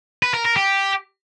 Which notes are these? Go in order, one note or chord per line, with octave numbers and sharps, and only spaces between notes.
B4
A#4
A#4
G4